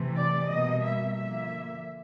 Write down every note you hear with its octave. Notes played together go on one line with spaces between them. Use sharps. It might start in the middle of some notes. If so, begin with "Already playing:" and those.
Already playing: C3 E3 A3
D5
B2 G3 A#3 D#5
E5
D3 F3 A#3 E5